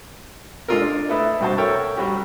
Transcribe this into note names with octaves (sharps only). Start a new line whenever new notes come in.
G#3 D4 F4 A4 A#4
D4
A3 E4 A4 B4 D#5
G2 C3 F#4 C5 A5
A4 A#4 C#5 E5 G5
F#3 G3 F#4 G4